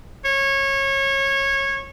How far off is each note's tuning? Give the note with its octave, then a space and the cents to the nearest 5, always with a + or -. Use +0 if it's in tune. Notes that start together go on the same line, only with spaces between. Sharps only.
C#5 -20